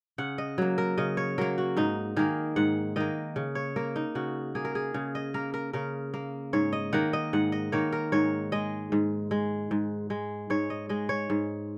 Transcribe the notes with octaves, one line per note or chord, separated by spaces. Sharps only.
C#3 F#5
D#5
F#3 A#3
A#4
C#3 D#5
C#5
F#3 A#3 A#4
F#4
G#2 D#4
D#3 A#3 G#4
G#2 F#5
D#3 A#3 D#5
C#3
C#5
A#3 A#4
D#4
C#3 F#4
A#3 G#4
A#4
G#4
C#3
D#5
A#3 A#4
A#4
C#3 A#4
A#3
G#2 C#5
D#5
D#3 A#3 F#5
D#5
G#2 F#5
D#5
D#3 A#3 C#5
A#4
G#2 C#5
G#3 D#5
G#2
G#3
G#2
G#3
G#2 C#5
D#5
G#3 D#5
C#5
G#2